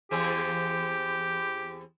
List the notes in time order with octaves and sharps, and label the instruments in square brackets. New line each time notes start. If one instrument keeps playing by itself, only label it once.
[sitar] E2 C4 G#4 [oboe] G4